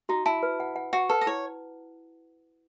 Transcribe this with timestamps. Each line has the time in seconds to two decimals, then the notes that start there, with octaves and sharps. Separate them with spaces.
0.09 D#4 F#4
0.26 E4 A5
0.43 B4
0.60 F#5
0.76 F#5
0.93 F#4 F#5
1.09 A4 B4
1.21 D#5
1.27 E4 C#5